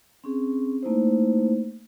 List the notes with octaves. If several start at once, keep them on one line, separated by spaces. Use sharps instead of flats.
C4 C#4 G#4
A3 A#3 D#4 E4 C5